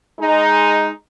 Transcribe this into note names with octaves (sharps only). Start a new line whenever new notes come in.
G#3 D#4